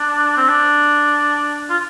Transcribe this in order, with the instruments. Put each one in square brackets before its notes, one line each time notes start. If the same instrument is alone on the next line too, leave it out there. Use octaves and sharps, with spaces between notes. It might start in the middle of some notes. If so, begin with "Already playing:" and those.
Already playing: [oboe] D4
C4
D4
F4